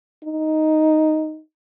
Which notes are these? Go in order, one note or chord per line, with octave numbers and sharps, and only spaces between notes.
D#4